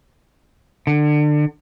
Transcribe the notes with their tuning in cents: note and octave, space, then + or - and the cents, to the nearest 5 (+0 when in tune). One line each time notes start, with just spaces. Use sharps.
D3 +25